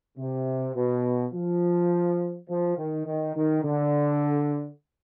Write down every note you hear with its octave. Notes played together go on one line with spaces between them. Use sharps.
C3
B2
F3
F3
D#3
D#3
D#3
D3